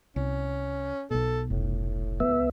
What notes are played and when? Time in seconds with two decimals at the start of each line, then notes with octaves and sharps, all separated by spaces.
0.16 C2 C#4
1.11 B1 B2 A4
1.50 F1 A2
2.20 C#2 B3 E5